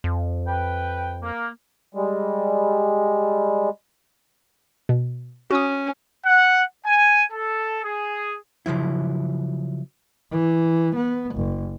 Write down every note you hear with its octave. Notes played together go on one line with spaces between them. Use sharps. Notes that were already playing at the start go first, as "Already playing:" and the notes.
F2
B4 G5
A#3
G3 G#3
B2
C#4 F#4 D#6
F#5
G#5
A4
G#4
C#3 F3 F#3 E4
E3
B3
F#1